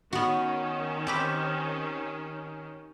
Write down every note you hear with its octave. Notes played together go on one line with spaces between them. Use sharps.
D#3 B3 C#4 F#4
C4 G4 B4